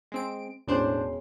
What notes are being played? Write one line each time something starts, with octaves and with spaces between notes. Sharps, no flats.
G#3 C4 D7
E1 A2 C#4 D4 C5 C6